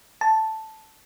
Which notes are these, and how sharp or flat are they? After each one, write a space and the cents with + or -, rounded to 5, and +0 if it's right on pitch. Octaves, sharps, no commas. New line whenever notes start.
A5 +0